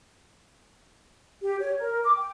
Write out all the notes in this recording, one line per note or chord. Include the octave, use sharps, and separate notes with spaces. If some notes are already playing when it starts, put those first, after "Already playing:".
G4
C#5
A#4
D6
G5